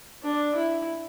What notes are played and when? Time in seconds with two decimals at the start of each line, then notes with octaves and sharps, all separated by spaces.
0.23 D4
0.55 E4